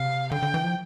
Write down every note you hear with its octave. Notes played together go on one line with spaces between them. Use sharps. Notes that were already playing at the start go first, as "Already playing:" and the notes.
Already playing: C3 F5
D3 G5
D3
E3
F3